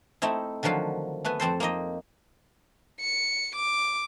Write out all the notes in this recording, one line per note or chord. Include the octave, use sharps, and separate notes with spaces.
A3 C4 D#4 E4
D3 D#3 F3 F#3 F4
A3 B3 B4 G#5
F2 C4 A4 C5
A#3 C4 D#4 D#5
C#7
D6